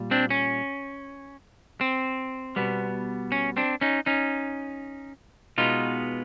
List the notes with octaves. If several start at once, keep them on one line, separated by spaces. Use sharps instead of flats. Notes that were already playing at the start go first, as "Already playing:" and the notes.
Already playing: A#2 G3
C4 D4
C#4
C4
B2 G3 B3
C#4
C4 D4
C#4 D#4
C#4 D#4
B2 G#3 B3 D#4 F4